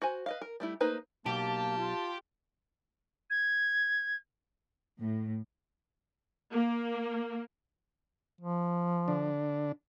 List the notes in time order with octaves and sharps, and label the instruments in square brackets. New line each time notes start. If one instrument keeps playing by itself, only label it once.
[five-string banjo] F#4 C5 G#5
B4 D#5 F5
A#4
G3 A3 E4
A3 A#3 D#4 B4 C5
[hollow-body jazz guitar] B1 [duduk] A#3 [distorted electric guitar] G4 [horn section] A5
[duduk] F4
[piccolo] G#6
[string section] A2
[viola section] A#3
[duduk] F3
[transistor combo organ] D3 D4